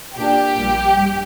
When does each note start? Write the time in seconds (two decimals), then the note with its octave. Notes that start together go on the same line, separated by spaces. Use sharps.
0.17 A#2 A#3 D4 G4
0.56 A#1 A#2 G3 A#3
0.95 G2